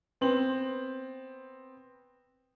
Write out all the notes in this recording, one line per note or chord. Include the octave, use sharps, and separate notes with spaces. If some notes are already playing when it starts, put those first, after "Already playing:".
B3 C4 F#7